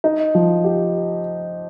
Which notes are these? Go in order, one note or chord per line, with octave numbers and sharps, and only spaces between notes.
D#4
F3
G4